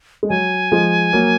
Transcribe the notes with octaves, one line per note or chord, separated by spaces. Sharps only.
G#3
F#3 G#5
F3 G#3
F#3 A#3